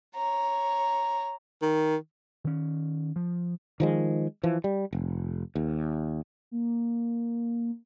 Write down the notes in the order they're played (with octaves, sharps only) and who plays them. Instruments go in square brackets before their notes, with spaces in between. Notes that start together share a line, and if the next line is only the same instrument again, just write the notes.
[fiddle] C#5 A#5
[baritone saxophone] D#3
[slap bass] D#3 C#4
F3
[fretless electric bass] D#3 F3 G#3
E3 F3
G3
F1
D#2
[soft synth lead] A#3